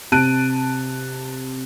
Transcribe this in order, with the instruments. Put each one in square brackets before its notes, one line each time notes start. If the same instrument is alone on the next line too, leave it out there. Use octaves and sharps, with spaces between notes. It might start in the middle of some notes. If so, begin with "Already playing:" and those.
[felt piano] C3 A5 F#6 D7 D#7